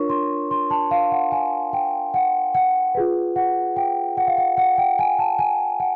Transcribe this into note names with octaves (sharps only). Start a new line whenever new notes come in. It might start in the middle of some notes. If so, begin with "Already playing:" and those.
Already playing: D4 F4 A#4 C#5 C#6
C6
C6
A5
F5
F#5
G#5
G5
F#5
F#5
F4 G#4 B4
F#5
G5
F#5
F5
F#5
F#5
G5
G#5
A5
G#5
F#5